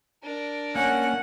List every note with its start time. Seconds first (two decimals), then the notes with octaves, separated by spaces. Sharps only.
0.23 D4 A#4
0.75 A#3 C#4 F#5